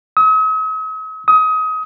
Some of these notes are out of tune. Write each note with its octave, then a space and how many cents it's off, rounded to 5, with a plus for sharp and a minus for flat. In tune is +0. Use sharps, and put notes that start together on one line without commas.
D#6 +45
D#6 +25